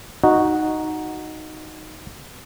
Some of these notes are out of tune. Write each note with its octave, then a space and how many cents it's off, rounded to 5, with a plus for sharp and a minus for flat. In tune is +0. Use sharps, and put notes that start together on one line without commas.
D#4 +0 F#4 -5